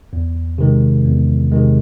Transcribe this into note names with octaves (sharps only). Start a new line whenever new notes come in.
E2
C3 D#3 G#3
E2
C3 D#3 G#3